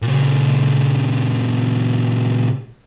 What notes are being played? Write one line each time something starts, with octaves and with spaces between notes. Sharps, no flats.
A#2 C#3